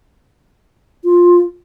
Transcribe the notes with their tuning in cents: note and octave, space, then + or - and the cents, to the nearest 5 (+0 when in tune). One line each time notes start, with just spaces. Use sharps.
F4 +10